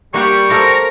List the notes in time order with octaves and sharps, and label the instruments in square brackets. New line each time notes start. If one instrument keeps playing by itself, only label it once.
[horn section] G3 [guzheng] A#3 F#4 [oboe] C#6
[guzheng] F4 A4 C5 [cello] A#4